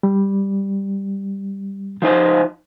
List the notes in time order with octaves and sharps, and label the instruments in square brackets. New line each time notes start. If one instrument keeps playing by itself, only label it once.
[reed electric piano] G3
[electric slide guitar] F3 D#4 C5